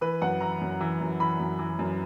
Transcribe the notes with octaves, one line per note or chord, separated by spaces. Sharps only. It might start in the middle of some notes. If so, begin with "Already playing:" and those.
E3 B4
F#2 F#5
E3 A#5
F#2
E3
F#2
E3 B5
F#2
E3
F#2